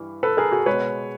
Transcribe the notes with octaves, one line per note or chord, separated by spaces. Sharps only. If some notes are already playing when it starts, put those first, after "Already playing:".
Already playing: G2 E3 G3
A4 B4
G#4 A#4
F#4 G#4
G#3 B4 C#5
B2